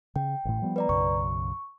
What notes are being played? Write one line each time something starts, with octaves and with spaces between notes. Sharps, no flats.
C#3 G5
A1 A2
F3 G3 B3
B4 D5 A#5
B1 F#2 C#3 C#6